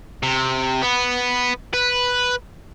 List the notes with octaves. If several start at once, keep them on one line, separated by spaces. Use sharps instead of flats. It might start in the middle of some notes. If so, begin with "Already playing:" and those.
C3
B3
B4